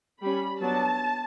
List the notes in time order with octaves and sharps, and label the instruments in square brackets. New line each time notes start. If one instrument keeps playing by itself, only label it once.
[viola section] G3 C#4 B5
F#3 B3 D4 A5